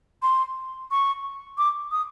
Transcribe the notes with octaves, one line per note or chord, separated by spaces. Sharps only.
C6
C#6
D6
D#6